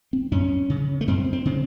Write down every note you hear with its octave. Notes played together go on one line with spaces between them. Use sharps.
C4
F#2 C#4
C#3
A3
F#2 C4
C4
C#3 C4